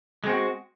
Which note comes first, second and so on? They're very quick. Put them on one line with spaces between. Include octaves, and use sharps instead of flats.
G#3 C4 F#4